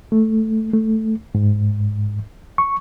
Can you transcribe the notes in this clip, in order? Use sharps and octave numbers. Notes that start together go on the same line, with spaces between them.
A3
A3
G#2
C#6